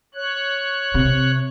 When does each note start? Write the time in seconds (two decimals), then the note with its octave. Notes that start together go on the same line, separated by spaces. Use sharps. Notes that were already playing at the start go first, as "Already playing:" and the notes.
0.15 C#5 F#6
0.94 C3